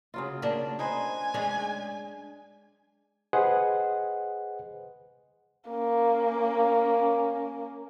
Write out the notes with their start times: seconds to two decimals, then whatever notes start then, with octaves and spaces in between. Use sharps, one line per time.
0.14 C#3 F#3 F4
0.42 A#3 D4
0.79 D#4 B4 C5 G#5
1.34 G#3 C#4 D4
3.33 G#4 B4 C5 D#5 F#5
5.70 A#3 C#4